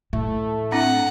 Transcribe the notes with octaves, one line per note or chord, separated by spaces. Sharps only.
A2 A3
C4 D4 E4 F#5